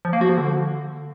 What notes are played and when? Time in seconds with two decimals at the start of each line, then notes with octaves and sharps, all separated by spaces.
0.05 F3
0.13 A#3
0.21 F#4
0.29 F3
0.38 D3